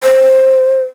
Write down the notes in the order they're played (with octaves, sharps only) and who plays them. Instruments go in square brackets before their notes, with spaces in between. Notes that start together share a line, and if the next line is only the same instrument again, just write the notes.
[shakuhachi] C5